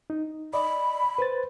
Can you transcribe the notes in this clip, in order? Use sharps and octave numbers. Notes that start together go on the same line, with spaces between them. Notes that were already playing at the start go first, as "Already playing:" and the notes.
D#4
D5 D#5 B5
B4 C5 A6